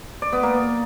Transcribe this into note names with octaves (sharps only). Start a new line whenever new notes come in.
D5
B3
A#3